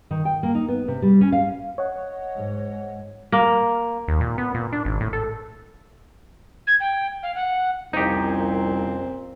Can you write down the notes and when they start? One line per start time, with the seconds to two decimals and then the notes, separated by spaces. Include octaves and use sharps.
0.11 D#3
0.25 G5
0.43 A#3
0.55 D#4
0.68 B3
0.88 C3
1.02 G3
1.21 C#4
1.32 F5
1.78 C#5 D#5 F#5
2.35 G#2
3.32 A#3
4.08 D#2
4.21 A#2
4.38 B3
4.54 A#2
4.73 D4
4.85 G#1
5.00 A2
5.13 A4
6.67 G#6
6.80 G5
7.23 F5
7.35 F#5
7.93 C2 F2 A#2 C4 C#4 D#4 G4